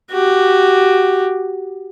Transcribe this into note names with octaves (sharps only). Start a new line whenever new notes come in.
F#4 G4